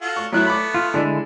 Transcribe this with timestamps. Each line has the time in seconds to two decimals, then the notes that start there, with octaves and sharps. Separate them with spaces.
0.01 F4 F#4 A4
0.16 C#6
0.32 F#3 A3 B3 E4 F#6
0.47 B5 D6
0.74 F4
0.94 D3 G#3 D4 E4